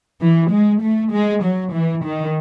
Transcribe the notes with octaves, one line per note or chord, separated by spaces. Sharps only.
E3
G#3
A3
G#3
F#3
E3
D#3